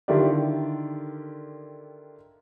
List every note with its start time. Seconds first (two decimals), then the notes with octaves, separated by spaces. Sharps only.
0.08 D3 D#3 E4 F4 G4 D5